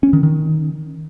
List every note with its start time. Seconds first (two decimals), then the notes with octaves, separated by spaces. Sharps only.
0.03 C#4
0.13 D#3
0.23 D#3